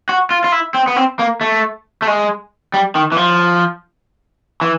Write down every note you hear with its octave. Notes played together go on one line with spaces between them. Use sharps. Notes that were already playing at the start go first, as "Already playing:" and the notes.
F#4
F4
F4
E4
C4
B3
C4
A#3
A3
A3
G#3
G3
D#3
E3
F3
E3